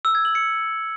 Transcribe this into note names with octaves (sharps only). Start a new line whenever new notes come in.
E6
G#6
F#7
C#7